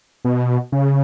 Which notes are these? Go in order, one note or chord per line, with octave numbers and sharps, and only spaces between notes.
B2
C#3